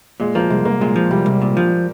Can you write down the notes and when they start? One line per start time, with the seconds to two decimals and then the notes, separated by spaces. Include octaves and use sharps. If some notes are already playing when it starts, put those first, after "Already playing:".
0.20 A#2 G#3
0.35 F3 A#3
0.50 C2 G#3
0.65 C2 A#3
0.81 A#2 G#3
0.96 F3
1.11 C2 G3
1.26 C2
1.42 A#2
1.57 F3